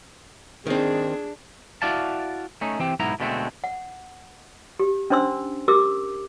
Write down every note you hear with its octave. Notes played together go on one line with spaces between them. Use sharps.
D#3 C4 D4 G#4
E4 F#4 D5 F5 A5
A3 C#4 D#4
E3 C4 G4
B1 G#2 B3 E4 A#5
B2 D3 G#3 A3 C4
F#5
G4
C#4 D4 C5 C6 E6
G4 A#4 D6 E6